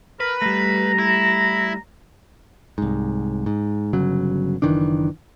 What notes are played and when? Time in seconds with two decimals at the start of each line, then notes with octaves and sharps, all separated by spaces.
0.20 A#4 B4
0.42 G3 A3 A#5
0.99 E4
2.78 C2 G#2
3.46 G#2
3.93 G1 C#3 F#3
4.62 F#1 D#3 E3 D4